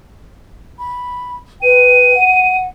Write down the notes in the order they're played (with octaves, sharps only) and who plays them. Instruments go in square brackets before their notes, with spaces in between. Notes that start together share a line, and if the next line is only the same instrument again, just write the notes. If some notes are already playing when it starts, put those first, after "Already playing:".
[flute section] B5
[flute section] B4 G5 [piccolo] D#7
[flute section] F#5